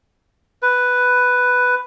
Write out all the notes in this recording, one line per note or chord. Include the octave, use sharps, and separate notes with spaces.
B4